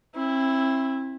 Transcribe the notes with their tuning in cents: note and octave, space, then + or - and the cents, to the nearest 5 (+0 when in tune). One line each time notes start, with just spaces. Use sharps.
C4 +35 E4 +0